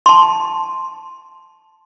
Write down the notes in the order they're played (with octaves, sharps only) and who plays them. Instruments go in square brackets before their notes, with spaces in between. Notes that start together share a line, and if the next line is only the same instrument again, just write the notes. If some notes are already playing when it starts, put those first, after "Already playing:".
[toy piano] A5 C6